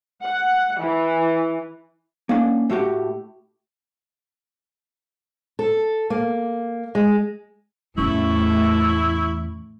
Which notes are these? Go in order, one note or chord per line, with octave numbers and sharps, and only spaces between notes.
F#5
E3
A#3 C#4 D4
A2 A3 F#4 G4
A4
A#3
G#3
E2 A2 A3 C#4 E4 C#6